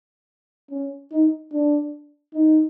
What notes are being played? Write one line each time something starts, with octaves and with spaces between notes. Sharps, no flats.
C#4
D#4
D4
D#4